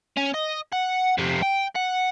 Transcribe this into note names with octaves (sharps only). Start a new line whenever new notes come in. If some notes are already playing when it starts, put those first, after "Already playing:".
C#4
D#5
F#5
F2 C3
G5
F#5